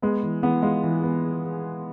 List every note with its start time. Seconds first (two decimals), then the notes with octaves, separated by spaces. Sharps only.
0.02 G#3 B3
0.23 E3
0.43 E3 B3
0.62 G#3 F4
0.83 E3
1.04 B3